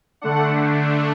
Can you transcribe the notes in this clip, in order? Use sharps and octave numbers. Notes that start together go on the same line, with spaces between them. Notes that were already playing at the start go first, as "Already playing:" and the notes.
D3 A3 D4 F#5